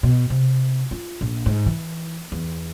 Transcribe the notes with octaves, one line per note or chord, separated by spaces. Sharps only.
B2
C3
F4
A#1
G#2
E3
E2